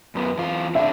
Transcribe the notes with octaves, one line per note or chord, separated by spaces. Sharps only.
F#2 B3
E2 F4
C3 D4 E5